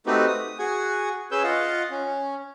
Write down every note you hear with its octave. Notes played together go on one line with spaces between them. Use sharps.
A3 C4 D#4 F#4 G4 B4
D#6
F#4 G#4 F#5 G#5
C#4 G#4 B4 C#5 E6 G6
F4 D#5 F5 F#5
C#4